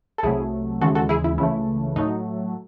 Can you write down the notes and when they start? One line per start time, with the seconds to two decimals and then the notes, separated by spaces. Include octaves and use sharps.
0.18 A4
0.23 C2 C3 F#3 A3 E4 G#4
0.80 D#2 C#3 E3 G#3 F#4 A4
0.95 F#4 A4
1.09 E4 G#4
1.24 E4
1.38 C#2 C#3 E3 A3 E4
1.96 A2 F#3 A3 D#4